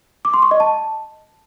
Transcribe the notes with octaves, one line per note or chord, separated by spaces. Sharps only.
D6
C6
C#6
D#5
A5